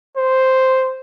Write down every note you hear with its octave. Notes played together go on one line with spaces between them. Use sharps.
C5